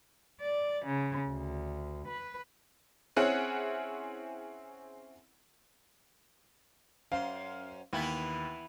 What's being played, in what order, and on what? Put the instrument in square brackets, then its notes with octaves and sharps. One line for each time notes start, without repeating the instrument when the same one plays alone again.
[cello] D5
C#3
D2
B4
[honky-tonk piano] C4 C#4 E4 G#4 F#5
[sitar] F#2 C5 [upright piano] F5
[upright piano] D#2 [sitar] E3 B3 E4